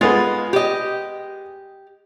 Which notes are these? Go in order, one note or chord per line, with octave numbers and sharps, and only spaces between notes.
G#3 B3 F4
G4 D#5